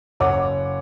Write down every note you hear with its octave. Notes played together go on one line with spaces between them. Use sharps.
F#1 C#5 F#5 D6